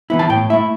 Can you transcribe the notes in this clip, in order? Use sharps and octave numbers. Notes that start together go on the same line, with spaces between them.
E3 B3 E4
A5
A2 G5
A3 E4 E5